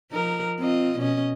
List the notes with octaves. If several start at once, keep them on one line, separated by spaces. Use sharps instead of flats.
F3 D#4 A#4
C4 F4 D#5
B2 C#4 D#5